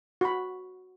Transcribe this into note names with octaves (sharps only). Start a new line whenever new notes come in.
F#4 B5